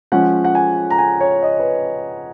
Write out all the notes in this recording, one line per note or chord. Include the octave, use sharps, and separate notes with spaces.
F3 G#3 C#4 F#5
F#5
G#5
A#5
G#5
C#5
D#5
B4